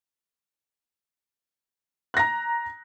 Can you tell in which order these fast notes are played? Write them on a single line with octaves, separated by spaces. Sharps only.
F#6 A#6 A#5